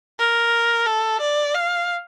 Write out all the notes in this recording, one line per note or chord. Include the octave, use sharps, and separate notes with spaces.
A#4
A4
D5
F5